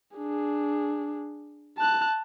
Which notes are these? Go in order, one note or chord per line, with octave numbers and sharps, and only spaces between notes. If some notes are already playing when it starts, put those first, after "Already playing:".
D4 G#4
A5 F#6